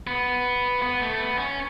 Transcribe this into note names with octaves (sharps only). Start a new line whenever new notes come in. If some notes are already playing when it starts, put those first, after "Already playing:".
B3
B3
A3
B3
C#4